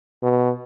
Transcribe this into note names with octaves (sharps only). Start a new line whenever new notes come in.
B2